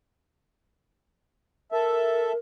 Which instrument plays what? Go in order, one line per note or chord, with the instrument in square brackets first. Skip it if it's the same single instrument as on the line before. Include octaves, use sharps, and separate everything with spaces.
[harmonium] A4 E5 [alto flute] A#4